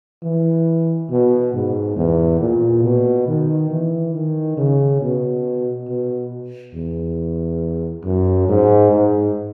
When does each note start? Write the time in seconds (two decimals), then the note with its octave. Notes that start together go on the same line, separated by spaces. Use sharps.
0.23 E3
1.10 B2
1.54 G#2
1.96 E2
2.40 A#2
2.83 B2
3.27 D#3
3.71 E3
4.14 D#3
4.57 C#3
5.01 B2
5.88 B2
6.74 E2
8.04 F#2
8.48 G#2
8.91 G#2